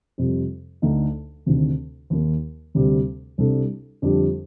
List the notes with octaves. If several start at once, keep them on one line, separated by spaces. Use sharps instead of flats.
F2 C3 G3
D2 D3 A3 D#4
D2 C3 D#3
D#2 D#3 A#3
D2 C3 G3
C2 C3 G3 D4 A4
F2 D3 G3 D4 G4